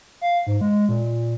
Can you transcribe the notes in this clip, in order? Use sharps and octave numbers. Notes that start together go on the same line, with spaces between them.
F5
G#2
G#3
A#2